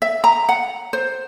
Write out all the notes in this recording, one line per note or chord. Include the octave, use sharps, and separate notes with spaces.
E5
A#5
F#5
C5